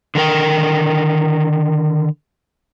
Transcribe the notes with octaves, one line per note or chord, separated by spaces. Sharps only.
D3 D#3 A#4 G5